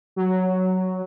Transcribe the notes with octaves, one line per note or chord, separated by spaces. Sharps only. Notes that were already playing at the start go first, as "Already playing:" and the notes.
F#3